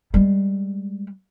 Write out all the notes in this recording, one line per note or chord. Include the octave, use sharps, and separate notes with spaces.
G3 G#3